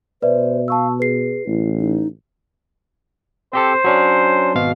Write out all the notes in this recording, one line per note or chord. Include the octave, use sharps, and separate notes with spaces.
B2 B4 C5 D5 E5
F5 A5 C#6 E6
G#4 B4 C7
A1 E4
D#4
C4 G4 A4 C5
F#3 C#4 D4
G#1 B2 F5